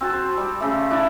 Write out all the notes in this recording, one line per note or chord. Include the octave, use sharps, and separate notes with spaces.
C4 F#4 A5
C5
G3 G4
C#3 A3
D4 E4 D5